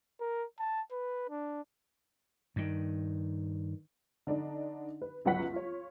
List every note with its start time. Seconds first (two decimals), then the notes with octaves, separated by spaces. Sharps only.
0.20 A#4
0.59 A5
0.92 B4
1.30 D4
2.56 G2 D#3
4.27 D3 D4 D#4
5.02 B4
5.25 G1 C#2 F#3 B4 F#5 B6
5.53 F4 C#5